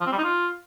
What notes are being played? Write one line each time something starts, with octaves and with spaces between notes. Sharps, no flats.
F3
C4
G3
D#4
F4